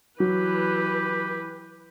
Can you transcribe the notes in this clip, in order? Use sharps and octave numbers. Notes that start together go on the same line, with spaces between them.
E3 F#3 G4 B4